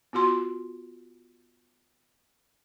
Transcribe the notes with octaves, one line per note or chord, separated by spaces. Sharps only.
B3 F4 F#4 C6